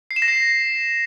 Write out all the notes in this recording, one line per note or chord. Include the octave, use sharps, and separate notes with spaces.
C7
E7
A#6
C7